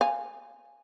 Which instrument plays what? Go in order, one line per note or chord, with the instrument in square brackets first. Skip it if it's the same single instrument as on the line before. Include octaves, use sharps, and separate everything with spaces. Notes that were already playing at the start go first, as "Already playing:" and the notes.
[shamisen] F5 G#5